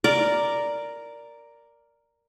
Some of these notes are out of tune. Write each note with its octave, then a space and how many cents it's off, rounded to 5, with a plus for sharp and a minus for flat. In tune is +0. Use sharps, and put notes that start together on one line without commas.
A#4 +0 D5 +0